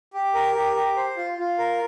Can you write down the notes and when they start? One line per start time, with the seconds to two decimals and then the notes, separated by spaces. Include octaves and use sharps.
0.13 G4
0.34 A#4
0.55 G4
0.76 G4
0.96 C5
1.17 F4
1.38 F4
1.58 A#4